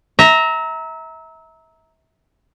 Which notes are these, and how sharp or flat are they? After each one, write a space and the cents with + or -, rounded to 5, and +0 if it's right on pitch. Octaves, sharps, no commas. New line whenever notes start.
E5 -30 A#5 +0